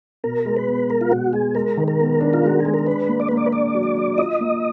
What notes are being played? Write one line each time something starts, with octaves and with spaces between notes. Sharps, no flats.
B2 A#4
G#3
B4
B3
G#3 A#4
F4
B2 F#4
G#3 G#4
G#3 A#4
D#3
A#4
B3
D4
F4
G#3 F#4
G#3 G#4
A#4
D4 B4
A#3
D5
A#3 B4
D5
B4
D4 D5
F#3
F#3
F4 D#5
A#3